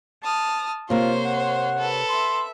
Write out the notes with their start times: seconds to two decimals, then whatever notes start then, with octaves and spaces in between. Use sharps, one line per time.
0.24 A5 D#6 F6
0.90 C3 A#3 F4 C5 C#5 C6
1.25 F#5
1.78 A4 B4
2.09 E5 C6